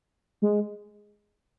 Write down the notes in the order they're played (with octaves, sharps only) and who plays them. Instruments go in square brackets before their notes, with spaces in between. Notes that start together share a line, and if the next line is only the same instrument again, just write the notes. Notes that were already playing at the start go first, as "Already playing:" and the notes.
[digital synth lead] G#3